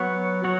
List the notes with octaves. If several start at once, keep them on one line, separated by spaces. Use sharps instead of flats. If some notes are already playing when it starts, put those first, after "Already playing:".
Already playing: F#3 B3 F#4 C#5
F#3 F#4 C#5